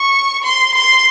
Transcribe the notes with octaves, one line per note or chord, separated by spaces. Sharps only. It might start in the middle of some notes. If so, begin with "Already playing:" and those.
Already playing: C#6
C6
C6